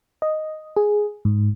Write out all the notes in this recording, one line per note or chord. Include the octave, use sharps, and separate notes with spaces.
D#5
G#4
G#2